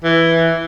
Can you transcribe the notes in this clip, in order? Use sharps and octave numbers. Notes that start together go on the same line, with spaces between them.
E3